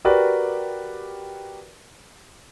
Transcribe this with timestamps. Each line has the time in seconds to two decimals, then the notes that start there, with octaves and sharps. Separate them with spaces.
0.05 F#4 G4 A#4 B4 D5